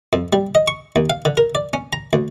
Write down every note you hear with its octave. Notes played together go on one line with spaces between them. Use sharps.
F2
G3
D#5
C#6
D#2
F5
D3
A#4
D5
C#4
A#5
D2